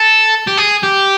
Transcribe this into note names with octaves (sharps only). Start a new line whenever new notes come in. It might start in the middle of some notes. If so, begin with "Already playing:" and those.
Already playing: A4
G4
G#4
G4